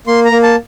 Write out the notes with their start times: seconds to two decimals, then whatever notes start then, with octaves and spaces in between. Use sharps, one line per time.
0.07 A#3 C6
0.25 A#5
0.32 A#3
0.43 A5